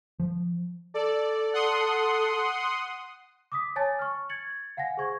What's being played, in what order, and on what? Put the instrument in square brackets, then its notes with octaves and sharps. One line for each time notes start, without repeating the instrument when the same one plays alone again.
[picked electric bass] F3
[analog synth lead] A4 [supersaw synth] D5
[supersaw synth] F#5 C6 D#6
[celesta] D6 D#6 B6
C#5 G#5 A5 A6
C#6 F6
G#6 A6 C#7 F#7
F5 F#5 G#5 A#6
G#4 C5 C#6 G#6